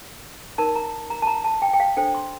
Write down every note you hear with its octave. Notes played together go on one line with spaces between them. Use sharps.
D#4 A#4 A5
A#5
A#5
A5
A#5
A5
G5
G5
F5
D4 A4 C5 G5
C6